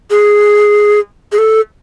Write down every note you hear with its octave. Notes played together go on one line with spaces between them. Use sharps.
G#4
G#4
A4